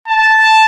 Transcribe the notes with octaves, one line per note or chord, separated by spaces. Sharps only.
A5